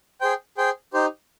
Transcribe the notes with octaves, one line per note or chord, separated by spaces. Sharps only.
G#4 C5 G5
G#4 C5 G5
D#4 G4 C5